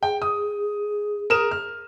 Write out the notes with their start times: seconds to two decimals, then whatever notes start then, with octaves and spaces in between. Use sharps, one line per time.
0.03 G#4 G5
0.22 D#6
1.30 A#4 D#6 E7
1.51 F6